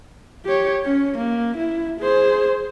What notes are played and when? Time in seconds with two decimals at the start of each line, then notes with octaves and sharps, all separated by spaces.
0.45 G4 C#5
0.84 C#4
1.18 A#3
1.57 E4
2.00 G#4 C5